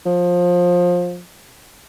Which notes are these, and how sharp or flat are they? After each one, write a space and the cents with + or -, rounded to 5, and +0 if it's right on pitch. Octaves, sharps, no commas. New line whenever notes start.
F3 +20